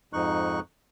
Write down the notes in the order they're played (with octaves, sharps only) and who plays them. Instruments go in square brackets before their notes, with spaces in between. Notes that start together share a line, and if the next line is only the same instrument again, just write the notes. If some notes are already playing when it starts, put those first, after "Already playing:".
[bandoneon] F2 G#2 D#4 C#6 F#6